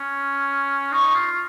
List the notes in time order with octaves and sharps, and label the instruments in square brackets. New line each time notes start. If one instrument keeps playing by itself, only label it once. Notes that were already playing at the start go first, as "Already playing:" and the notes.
Already playing: [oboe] C#4
[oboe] D#4 [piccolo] C#6
[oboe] F4